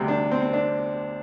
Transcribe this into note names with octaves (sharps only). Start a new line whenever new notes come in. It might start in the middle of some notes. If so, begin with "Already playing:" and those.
Already playing: D2 C3 G3
D4
C4
C4
D4